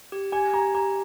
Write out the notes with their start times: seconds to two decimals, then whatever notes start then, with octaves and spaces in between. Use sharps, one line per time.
0.12 G4
0.32 G4 G#5
0.53 G4 A#5
0.74 G4 A#5